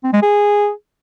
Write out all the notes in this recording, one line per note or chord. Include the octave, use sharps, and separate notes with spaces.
C4
G#3
G#4